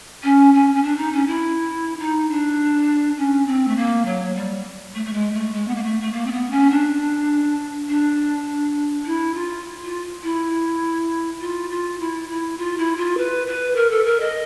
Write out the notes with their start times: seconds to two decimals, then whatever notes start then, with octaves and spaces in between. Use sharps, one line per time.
0.23 C#4
0.54 C#4
0.74 C#4
0.83 D4
0.97 D#4
1.12 C#4
1.27 E4
1.99 D#4
2.30 D4
3.17 C#4
3.46 C4
3.67 A3
3.76 A#3
4.05 F#3
4.35 G3
4.94 A3
5.05 A3
5.13 G#3
5.33 A3
5.53 G#3
5.67 B3
5.75 A#3
5.83 A3
6.01 A3
6.12 A#3
6.26 C4
6.32 B3
6.50 C#4
6.70 D4
7.88 D4
9.06 E4
9.35 F4
9.84 F4
10.23 E4
11.40 F4
11.70 F4
12.00 E4
12.29 E4
12.58 F4
12.78 E4
12.97 F4
13.17 B4
13.47 B4
13.76 A#4
13.90 A4
14.05 A#4
14.20 D#5